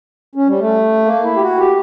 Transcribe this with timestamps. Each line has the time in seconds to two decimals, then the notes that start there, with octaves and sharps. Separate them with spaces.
0.35 C#4
0.47 G3
0.59 A3
1.05 A#3
1.23 E4
1.36 G4
1.41 F#4
1.58 G4